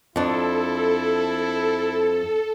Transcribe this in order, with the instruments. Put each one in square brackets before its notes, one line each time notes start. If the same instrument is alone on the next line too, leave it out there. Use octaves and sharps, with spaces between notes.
[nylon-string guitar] F2 D4 [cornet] E4 [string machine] A4